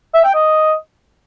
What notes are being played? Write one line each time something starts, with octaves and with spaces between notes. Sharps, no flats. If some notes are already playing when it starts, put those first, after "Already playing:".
E5
G5
D#5